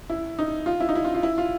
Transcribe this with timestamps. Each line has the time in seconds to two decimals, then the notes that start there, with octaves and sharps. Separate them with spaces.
0.10 E4
0.39 D#4
0.66 F4
0.80 E4
0.89 D#4
0.95 E4
1.05 F4
1.15 F4
1.23 E4
1.38 F4